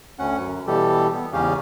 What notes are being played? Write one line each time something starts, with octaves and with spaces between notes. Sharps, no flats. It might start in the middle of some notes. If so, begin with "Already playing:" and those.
D2 C#4 F#5
F#2
B2 E3 G3 G4 A4
B3
E2 G#2 C#3 C#4 G4 F5